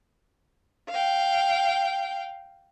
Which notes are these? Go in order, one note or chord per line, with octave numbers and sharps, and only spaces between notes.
F5 G5